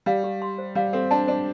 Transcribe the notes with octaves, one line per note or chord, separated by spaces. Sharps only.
G3 F5
G4
C6
C5
G3 F5
C4 A4
D4 A5
D4 C5